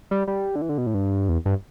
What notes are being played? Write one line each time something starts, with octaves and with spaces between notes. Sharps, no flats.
G3
G3
D3
E3
D3
B2
A2
G2
E2
G2